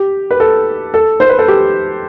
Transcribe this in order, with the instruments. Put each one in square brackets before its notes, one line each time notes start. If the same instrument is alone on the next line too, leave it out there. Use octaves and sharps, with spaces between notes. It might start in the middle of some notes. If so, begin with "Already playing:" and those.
Already playing: [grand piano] G4
B4
A4
A4
C5
B4
A4
G4